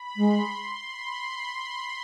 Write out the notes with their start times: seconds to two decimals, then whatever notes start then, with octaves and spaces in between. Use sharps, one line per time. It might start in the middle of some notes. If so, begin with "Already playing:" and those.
Already playing: B5
0.16 G#3 C6
0.50 C6
0.82 B5